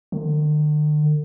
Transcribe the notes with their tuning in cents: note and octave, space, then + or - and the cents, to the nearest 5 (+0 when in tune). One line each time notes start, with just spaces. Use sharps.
D3 +45